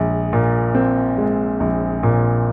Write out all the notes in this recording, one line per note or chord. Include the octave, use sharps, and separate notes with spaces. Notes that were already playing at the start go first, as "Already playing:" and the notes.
Already playing: A#1 G#3
A#2
C4
G#3
A#1
A#2